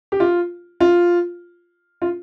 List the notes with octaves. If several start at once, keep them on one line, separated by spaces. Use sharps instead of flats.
G4
F4
F4
F4